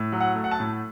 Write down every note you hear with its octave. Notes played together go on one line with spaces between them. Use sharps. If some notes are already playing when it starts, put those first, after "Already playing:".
Already playing: A2
F#3
F#5
A3
F#5
A5
A2